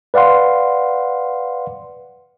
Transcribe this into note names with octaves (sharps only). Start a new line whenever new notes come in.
B4 D5 F5 F#5 C6